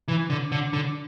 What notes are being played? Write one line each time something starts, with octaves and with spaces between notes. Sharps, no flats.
E3
D3
D3
D3